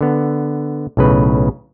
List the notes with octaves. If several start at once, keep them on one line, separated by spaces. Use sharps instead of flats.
D3 B3
B1 A2 C#3 B4